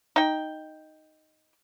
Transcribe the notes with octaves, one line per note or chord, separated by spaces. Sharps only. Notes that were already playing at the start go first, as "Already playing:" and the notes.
D#4 G5